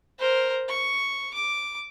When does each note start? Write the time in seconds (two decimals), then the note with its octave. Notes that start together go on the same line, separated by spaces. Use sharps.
0.19 A#4 C5
0.68 C#6
1.34 D6